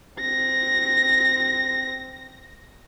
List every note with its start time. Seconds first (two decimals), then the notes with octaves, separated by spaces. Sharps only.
0.20 C4 A#6